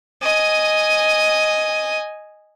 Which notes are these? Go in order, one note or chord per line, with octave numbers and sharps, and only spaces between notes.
D#5 G#5